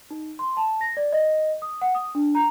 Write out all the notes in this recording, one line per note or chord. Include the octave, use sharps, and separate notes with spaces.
D#4
C6
A5
A#6
D5
D#5
D#6
F#5
D#6
D4
A#5